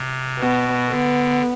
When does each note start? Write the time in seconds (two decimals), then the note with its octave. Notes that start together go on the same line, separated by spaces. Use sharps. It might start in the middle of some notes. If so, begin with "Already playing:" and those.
Already playing: C3
0.39 B2 B3
0.90 D3 B3